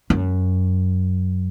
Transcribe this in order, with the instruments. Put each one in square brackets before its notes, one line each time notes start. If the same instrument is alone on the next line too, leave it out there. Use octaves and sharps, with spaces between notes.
[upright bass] F#2